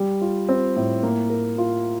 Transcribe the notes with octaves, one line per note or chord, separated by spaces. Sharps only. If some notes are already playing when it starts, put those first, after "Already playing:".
Already playing: G3
F4
C4
A2
A#3
A#4
F4